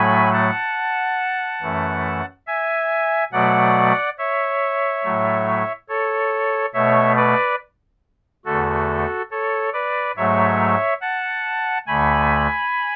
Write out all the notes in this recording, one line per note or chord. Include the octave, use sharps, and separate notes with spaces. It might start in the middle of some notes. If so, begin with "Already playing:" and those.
Already playing: A2 F#3 A3 G#5 B5
F#5 A5
F#2 E3 A3
E5 G#5
B2 F#3 A3 D5 F#5
C#5 E5
A2 F#3 A3
A4 C#5
B2 A3 C#5 E5
B4 D5
E2 D3 A3 F#4 A4
A4 C#5
B4 D5
G#2 F#3 A3 C#5 E5
F#5 A5
D2 D3 A3 G#5 B5